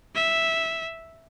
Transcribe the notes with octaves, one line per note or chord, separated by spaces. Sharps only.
E5